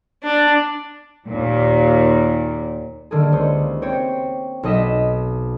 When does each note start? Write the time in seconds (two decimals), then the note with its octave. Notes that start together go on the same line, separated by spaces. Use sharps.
0.23 D4
1.28 D#2 A#2
3.11 D3 D#3 A#3 G4 G#4
3.32 C#2 C5 C#5 D#6
3.82 C4 C5 C#5 G5
4.63 B1 D#4 D#5 B6 E7